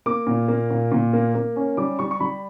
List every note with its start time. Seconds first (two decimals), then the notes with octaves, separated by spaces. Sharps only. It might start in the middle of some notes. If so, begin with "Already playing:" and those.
0.06 A#3 D6
0.27 A#2
0.48 A#3
0.71 A#2
0.92 A#2
1.13 A#3
1.35 A#3
1.56 C#4
1.77 G3 D6
1.99 G3 C#6
2.11 C#6
2.20 G3 B5